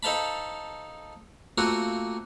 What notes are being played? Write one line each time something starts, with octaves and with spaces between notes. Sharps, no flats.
D#4 A4 C5 F5 A5 B5
A3 A#3 C4 F4 F#4